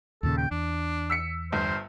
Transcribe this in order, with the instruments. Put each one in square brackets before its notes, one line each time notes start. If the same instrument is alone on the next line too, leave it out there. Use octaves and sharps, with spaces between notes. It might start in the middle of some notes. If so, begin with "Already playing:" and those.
[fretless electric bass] D#2 A#2 C#3 [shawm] A4
[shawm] G5
[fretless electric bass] E2 [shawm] D4
[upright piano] E6 B6 C#7
[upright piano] G1 G2 [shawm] C5